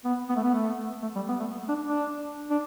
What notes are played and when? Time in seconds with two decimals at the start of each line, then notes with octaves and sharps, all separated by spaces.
0.04 B3
0.29 B3
0.36 A3
0.44 B3
0.54 A3
1.02 A3
1.15 G3
1.28 B3
1.40 A3
1.69 D4
1.85 D4
2.50 D4